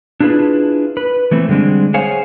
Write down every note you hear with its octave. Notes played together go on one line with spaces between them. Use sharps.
D4 E4 F4 G#4 B4
B4
E3 A3 C4
D3 G3 G#3 C4 D4
G#4 C5 C#5 F5 F#5 G#5